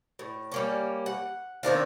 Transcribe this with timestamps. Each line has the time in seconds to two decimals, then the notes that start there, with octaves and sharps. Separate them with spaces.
0.19 A2
0.52 G3 A#3 C#4
1.06 F#5
1.63 D#3 C4 D4 F4